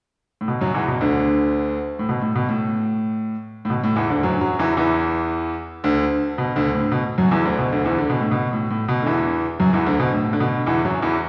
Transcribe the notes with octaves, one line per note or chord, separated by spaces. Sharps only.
A2
B2
F#2 F#3
E2 E3
B2
D2 D3
A2
B2
A2
B2
A2
A2
B2
A2
E2 E3
D2 D3
F#2 F#3
F#2 F#3
E2 E3
E2 E3
D2 D3
B2
D2 D3
A2
B2
F#2 F#3
E2 E3
D2 D3
B2
D2 D3
E2 E3
D3
B2
A2
B2
A2
A2
B2
D3
E2 E3
F#2 F#3
E2 E3
D2 D3
B2
A2
D3
B2
E2 E3
F#2 F#3
E2 E3